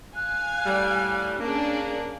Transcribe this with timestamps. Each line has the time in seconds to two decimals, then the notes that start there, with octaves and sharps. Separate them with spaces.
0.16 F5 G#5 F#6
0.65 A2 G3
1.39 A#3 C#4 D4 G#4